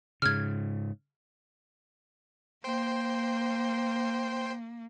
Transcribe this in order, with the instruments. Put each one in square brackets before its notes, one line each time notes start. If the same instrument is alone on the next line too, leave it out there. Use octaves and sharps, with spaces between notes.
[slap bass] G#2 C#3 [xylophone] F6 G#6
[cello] A#3 [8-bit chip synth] C5 G5 C6